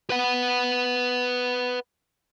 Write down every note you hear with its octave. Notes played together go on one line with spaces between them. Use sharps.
B4 F#5